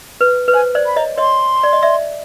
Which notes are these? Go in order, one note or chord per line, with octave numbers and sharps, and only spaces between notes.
B4
B4
C5 G#5
C5 D5
B5
C#5 D#5 A#5
C#5 D#5 C6
D5
D#5
D5 E5